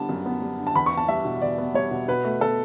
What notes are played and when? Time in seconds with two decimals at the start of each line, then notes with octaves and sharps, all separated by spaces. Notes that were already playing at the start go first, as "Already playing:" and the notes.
Already playing: D3 G3 B3 A5
0.09 F#2
0.26 B3
0.42 G3
0.59 D3
0.67 A5
0.75 E2 B5
0.86 C#6
0.92 B3
0.97 A5
1.08 G3 E5
1.25 B2
1.42 E2 D5
1.58 B3
1.74 G3 C#5
1.91 B2
2.08 B2 B4
2.24 A3
2.41 B2 A4